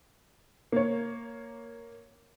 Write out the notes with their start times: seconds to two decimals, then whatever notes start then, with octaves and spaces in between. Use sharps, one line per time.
0.72 A#3 C#5